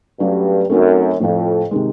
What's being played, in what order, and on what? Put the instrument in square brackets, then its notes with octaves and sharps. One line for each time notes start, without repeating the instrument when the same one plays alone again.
[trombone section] G2 [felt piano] F#3 A3 C#4
[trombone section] F#2 [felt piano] A3 C4 D#4 F#4
[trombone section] F2 [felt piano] A2 F3 A3
[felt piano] C3 D#3 G#3